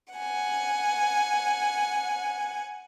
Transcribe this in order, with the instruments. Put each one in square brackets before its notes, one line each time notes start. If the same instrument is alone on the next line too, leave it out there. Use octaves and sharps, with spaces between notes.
[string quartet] F#5 G#5